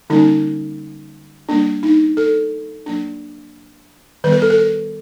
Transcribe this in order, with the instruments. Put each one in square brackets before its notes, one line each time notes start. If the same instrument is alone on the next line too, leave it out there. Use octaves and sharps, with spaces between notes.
[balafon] D3 G3 A#3 C#4 D#4
G3 A#3 D4
D#4
A4
F#3 A#3 D4
D#3 G3 B3 B4
A#4
A4
A#4